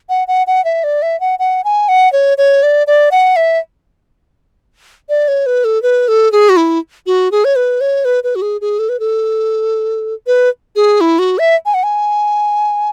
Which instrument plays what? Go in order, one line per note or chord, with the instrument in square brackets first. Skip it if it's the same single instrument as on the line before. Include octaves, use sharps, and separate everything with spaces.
[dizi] F#5
F#5
F#5
E5
D5
E5
F#5
F#5
G#5
F#5
C#5
C#5
D5
D5
F#5
E5
D5
C#5
B4
A4
B4
A4
G#4
F#4
E4
F#4
G#4
C#5
B4
C#5
B4
B4
F#4
G#4
G#4
A4
B4
A4
B4
G#4
E4
F#4
E5
G#5
F#5
G#5